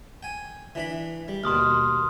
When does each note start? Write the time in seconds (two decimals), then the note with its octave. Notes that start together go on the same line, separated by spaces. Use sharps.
0.23 G5 G#5
0.75 E3 D4 B5
1.28 G3
1.44 D#2 B2 C6 D#6 F6